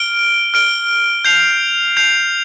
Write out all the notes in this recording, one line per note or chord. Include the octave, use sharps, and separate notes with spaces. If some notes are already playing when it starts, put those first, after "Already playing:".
Already playing: F6 D7 G7
F6 D7 G7
G6 C7 F7
G6 C7 F7